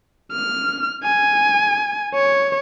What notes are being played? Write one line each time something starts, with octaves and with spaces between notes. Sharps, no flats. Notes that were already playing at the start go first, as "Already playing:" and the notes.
F6
G#5
C#5